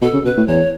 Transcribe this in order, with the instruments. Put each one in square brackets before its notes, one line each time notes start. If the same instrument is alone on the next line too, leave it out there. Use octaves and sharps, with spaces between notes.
[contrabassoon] B2 [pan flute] A4
[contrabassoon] C#3
[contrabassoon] B2 [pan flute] B4
[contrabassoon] A2
[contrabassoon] E2 [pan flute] C#5